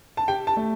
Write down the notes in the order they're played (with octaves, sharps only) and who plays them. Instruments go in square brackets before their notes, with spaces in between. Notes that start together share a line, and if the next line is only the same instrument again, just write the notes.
[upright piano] A5
[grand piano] G4 [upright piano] G5
[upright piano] A5
[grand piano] A3